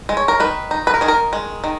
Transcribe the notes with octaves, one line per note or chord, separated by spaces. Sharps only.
G#3
C#5
A#4
D#3 B4
D#4
B4
A#4
D#3 G#4
A#4
G#3
D#3